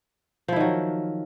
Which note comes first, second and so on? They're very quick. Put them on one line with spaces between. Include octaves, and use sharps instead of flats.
F3 E4 D#3 F#3